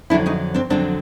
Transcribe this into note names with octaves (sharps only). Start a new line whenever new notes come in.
F2 D3 F#3 D4 E4
C#4 D#4
C4 D4
F2 D3 F#3 C4 D4